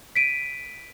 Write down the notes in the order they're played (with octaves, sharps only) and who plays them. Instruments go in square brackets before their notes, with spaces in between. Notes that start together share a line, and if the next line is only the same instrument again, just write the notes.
[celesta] B6 D7 D#7